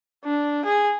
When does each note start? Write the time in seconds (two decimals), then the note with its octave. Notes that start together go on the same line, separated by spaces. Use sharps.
0.24 D4
0.65 G#4